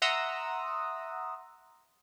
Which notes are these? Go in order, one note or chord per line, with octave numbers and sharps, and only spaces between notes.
E5 F#5 A#5 C6 D#6 E6